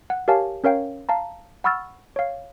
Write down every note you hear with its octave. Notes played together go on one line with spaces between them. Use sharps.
F#5
G4 A#4 C#5 F5 G#5 A5
C#4 A#4 C#5 F5 G5
F5 A5 A#5
F#5 B5 C#6 E6 F6 A6
C#5 F5